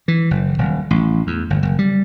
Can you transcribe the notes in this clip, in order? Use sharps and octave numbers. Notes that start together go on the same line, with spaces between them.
E3
F#1
D#1
A1
E2
G1
F#1
G3